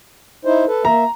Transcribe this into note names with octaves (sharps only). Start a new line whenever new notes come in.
D#4 E4 C5
A4 B4
A#3 E5 A#5